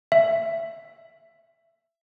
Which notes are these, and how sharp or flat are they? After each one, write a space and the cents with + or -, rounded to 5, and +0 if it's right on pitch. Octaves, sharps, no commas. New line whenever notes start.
E5 +20